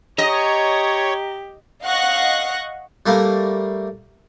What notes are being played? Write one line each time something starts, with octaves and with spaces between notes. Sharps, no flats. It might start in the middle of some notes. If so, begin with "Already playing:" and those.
G4 C#5 D#5 A#5
D#5 F5 F#5 C#6 F#6 A#6
G3 A3 A#3